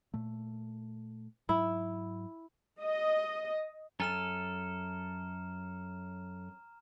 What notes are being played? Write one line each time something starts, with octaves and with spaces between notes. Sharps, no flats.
A#2 A3
G#2 F#3 E4
D#5
F#2 A4 G#5 A#5 F6 E7